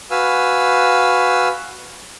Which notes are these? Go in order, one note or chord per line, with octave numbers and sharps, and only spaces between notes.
F#4 B4 F5 G#5 E6